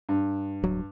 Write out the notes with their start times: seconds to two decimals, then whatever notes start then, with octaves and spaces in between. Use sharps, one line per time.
0.09 G2
0.64 D1 F#3